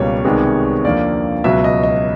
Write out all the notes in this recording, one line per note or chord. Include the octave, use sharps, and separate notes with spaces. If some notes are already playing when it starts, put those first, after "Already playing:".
Already playing: C#2 B2 G3 A#3 C#5
C2 C3 D#3 G#3 B3
D#2 D3 F3 A#3 D5
C#2 B2 F#3 E5
D#5
D#5